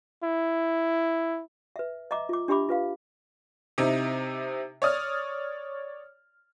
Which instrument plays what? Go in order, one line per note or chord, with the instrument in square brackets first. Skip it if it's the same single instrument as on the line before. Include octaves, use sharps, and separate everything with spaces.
[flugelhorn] E4
[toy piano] B4 E5
D#5 E5 A#5 D6
F4 D6
D4 G4 E5 B5 D6
F4 B4 F5
[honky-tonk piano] C3 D#4 E4
C#5 D5 D#6 F6